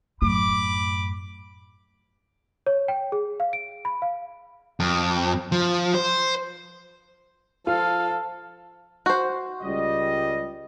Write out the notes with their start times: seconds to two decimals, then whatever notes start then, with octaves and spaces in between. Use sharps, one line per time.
0.22 F#2 A2 B5 D6
2.67 C#5
2.88 G5
3.12 G#4
3.40 F5
3.53 D7
3.85 B5
4.02 F5
4.80 F2
5.52 F3
5.95 C5
7.67 F3 F4 A4 F5
9.06 F#4 C5
9.63 C#2 G3 D#5